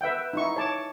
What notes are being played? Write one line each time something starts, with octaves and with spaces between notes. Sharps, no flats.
B4 E5 F#5 G5
D#4 E4 C#6
C#5 A5 D6